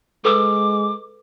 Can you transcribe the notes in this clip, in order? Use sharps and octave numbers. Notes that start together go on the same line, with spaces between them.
G#3 A4 B4 D6 E6